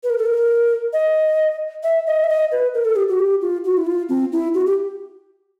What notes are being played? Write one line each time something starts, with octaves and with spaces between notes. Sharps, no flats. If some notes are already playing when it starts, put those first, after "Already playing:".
B4
A#4
A4
A#4
D#5
E5
D#5
E5
D#5
B4
A#4
A4
G4
F#4
G4
F4
F#4
E4
F4
C4
E4
F#4
G4